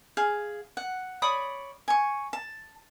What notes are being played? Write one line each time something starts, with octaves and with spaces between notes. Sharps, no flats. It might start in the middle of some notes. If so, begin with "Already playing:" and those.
G#4 F5
F#5
C#5 D5 B5 D#6
G#5 C#6
A5